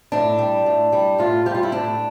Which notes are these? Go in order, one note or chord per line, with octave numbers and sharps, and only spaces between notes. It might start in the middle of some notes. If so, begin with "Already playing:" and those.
A2 D4
G3
A2
G3
A2 F4
G3 G4
F4
E4
A2 D4